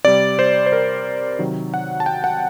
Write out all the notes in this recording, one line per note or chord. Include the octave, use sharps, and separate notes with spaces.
C3 G3 D5
C5
C5
A#4
C3 D#3 F#3
F#5
A5
G5
F#5